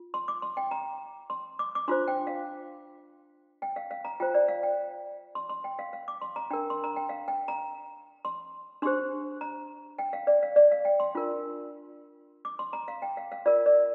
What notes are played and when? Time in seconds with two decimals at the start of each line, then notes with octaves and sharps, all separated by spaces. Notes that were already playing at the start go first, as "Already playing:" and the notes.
Already playing: F4
0.14 C6
0.28 D6
0.42 C6
0.57 G5
0.71 A#5
1.30 C6
1.59 D6
1.75 D6
1.88 D4 F4 C5 C6
2.07 G5
2.27 F5
3.62 G5
3.76 F5
3.91 F5
4.05 A#5
4.20 F4 C5 G5
4.34 D5
4.48 F5
4.63 G5
5.35 C6
5.49 C6
5.64 G5
5.79 F5
5.93 F5
6.08 D6
6.22 C6
6.36 A#5
6.50 D4 A#4 G5
6.70 C6
6.84 A#5
6.96 G5
7.09 F5
7.28 G5
7.48 A#5
8.25 C6
8.82 D4 G4 C5 C6
9.41 A#5
9.98 G5
10.13 F5
10.27 D5
10.43 F5
10.56 D5
10.72 F5
10.85 G5
11.00 C6
11.15 D4 F4 A#4
12.45 D6
12.59 C6
12.73 A#5
12.88 F5
13.02 G5
13.17 F5
13.32 F5
13.46 F4 A#4 D5
13.66 D5